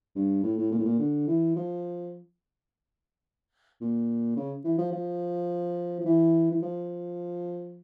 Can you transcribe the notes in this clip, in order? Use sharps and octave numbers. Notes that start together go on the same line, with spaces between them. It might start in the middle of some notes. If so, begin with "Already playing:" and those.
G2
A2
A2
A#2
A2
A#2
D3
E3
F3
A#2
C#3
E3
F3
F3
F3
E3
E3
F3